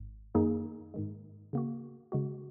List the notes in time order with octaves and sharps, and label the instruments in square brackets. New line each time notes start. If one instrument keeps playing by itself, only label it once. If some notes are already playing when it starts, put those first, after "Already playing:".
Already playing: [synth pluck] G#1 G#2
F#2 D#3 A#3 D#4 G#4
G#2 D#3 G#3
C#3 A#3 F#4
C#3 G#3 F#4